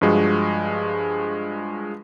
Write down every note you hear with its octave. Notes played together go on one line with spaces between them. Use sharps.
G2 F3 G#3 F#4